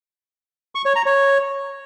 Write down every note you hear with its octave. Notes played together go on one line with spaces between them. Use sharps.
C#6
C#5
A#5
C#5